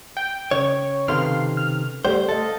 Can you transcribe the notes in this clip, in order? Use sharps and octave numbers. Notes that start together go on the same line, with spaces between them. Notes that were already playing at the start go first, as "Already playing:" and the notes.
G5
C#3 C#4 C#5 D#5
C3 D#3 C4 A4 B4 F5 C6 F6
F6
G3 A3 C5 F#5
A4 D#5 F5